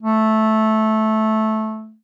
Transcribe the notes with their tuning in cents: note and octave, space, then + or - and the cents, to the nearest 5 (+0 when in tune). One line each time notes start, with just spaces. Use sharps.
A3 -10